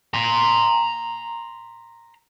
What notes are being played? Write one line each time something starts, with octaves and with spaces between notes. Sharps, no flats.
A#5 C6